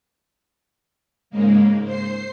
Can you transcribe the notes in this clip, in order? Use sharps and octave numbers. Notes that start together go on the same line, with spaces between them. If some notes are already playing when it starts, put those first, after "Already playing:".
G#2 C#3 G#3 A#3
C5 C7